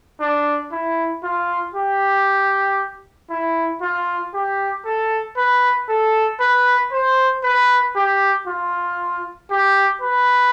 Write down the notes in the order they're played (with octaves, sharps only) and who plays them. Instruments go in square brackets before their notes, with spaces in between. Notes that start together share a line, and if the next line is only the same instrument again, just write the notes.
[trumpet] D4
E4
F4
G4
E4
F4
G4
A4
B4
A4
B4
C5
B4
G4
F4
G4
B4